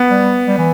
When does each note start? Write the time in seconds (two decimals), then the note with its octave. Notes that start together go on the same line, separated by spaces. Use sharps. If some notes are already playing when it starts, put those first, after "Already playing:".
Already playing: B3
0.10 G3
0.48 G3
0.58 E3